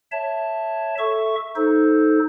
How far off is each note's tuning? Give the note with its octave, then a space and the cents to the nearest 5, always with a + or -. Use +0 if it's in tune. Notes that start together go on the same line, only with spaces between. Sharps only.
C#5 +0 E5 +0 A5 +0
A4 +0 E5 +0 C#6 +0
D#4 +5 A4 -15 C5 +0